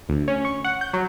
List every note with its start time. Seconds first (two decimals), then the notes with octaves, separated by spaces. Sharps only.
0.09 D2
0.28 C#4
0.45 C#6
0.64 F#5
0.81 G6
0.93 F#3